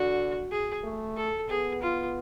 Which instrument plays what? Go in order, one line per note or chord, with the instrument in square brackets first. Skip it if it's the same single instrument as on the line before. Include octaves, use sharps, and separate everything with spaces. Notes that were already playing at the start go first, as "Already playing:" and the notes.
Already playing: [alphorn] D3 [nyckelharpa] F#4
[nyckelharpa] G#4
[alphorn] A3
[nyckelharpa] A4
[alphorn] B3 [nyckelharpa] G#4
[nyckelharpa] F4